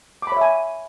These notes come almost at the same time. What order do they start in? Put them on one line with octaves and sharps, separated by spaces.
D6 B5 C#5 E5 G#5